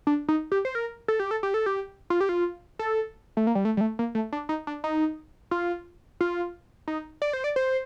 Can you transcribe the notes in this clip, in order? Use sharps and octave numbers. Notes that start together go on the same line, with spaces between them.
D4
D#4
G4
C5
A#4
A4
G4
A4
G4
A4
G4
F4
G4
F4
A4
A3
A#3
G3
A3
G3
A3
A#3
A3
D4
D#4
D4
D#4
F4
F4
D#4
D5
C5
D5
C5